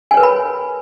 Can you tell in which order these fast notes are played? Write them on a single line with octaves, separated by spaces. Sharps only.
G#5 C#5 B4 A#4 B5